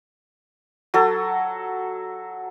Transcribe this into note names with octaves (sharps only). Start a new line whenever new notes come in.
F#3 A4